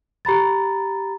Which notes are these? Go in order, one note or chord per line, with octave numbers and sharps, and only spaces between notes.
G4 A#5 B5 A6